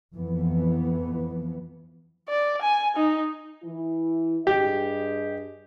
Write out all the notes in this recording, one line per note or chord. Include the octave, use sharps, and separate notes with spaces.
F2 E3 B3
D5
G#5
D#4
E3 E4
G2 G4 G#4 D#5